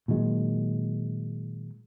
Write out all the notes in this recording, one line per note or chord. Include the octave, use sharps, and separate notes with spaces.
A#2 D#3 F#3 G#3